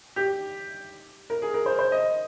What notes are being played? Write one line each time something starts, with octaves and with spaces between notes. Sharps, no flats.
G4
A#4
G#4
A#4
C5
C5
D#5